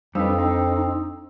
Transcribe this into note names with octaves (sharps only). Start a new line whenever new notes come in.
F2 F3 G3 D4 D#4 B4 D#6 E6
C4 D#4